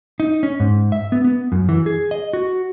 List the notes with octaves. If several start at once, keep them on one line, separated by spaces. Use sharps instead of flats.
D#4
C#4
G#2
E5
B3
B3
F#2
E3
G#4
D#5
F#4